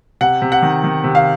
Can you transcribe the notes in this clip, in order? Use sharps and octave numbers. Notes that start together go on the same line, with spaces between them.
C3 F#5
C3
F#5
D#3
D#3
C3
F5